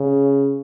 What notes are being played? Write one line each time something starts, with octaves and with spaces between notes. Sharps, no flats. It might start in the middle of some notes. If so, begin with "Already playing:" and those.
Already playing: C#3